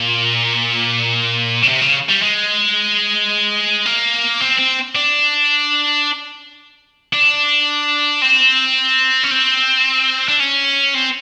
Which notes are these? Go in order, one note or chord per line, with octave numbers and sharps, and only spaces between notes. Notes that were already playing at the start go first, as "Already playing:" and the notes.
Already playing: A#2
C#3
C3
C#3
G3
G#3
A#3
C4
C4
D4
D4
C4
C#4
C4
D4
C#4
C4